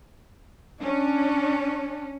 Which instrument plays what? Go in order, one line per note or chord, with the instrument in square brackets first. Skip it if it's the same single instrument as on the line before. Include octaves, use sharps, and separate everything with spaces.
[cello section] C#4 [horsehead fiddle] D4